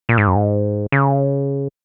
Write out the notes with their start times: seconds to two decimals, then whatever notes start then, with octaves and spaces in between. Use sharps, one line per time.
0.09 A#2
0.18 G#2
0.27 F#2
0.36 G#2
0.92 C#3